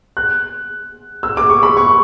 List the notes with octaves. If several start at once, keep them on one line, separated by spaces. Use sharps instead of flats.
F#6
E6
D6
C#6
B5
C#6